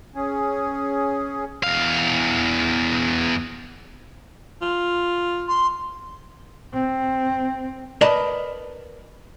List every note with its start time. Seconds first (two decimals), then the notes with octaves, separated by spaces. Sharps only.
0.15 C#4 G#4
1.63 E2 F5
4.62 F4
5.48 C6
6.74 C4
8.01 A#4 B4 D5 D#5 A5 A#5